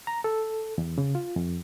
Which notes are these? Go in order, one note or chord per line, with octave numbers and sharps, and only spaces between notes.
A#5
A4
E2
C#3
F4
F2